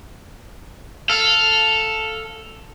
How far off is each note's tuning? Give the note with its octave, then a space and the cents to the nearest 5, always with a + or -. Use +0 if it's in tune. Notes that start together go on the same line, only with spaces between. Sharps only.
A4 +0 F5 +0